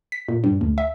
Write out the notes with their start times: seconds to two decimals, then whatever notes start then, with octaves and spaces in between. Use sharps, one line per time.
0.12 B6
0.28 A#2
0.44 G2
0.61 D2
0.78 E5